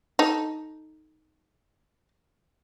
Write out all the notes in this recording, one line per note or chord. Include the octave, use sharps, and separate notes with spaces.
D#4 A4